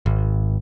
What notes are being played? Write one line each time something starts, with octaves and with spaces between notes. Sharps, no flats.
G#1